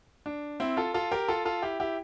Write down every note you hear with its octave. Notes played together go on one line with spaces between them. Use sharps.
D4
C4 E4
F4 A4
F4 A4
G4 A#4
F4 A4
F4 A4
E4 G4
E4 G4